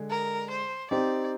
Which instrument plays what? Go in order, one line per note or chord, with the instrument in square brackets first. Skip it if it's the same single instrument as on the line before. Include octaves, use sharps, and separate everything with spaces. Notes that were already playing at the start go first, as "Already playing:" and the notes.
Already playing: [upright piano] D3 G#3 G#4
[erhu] A#4
C5
[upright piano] C4 D#4 G4 [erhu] D5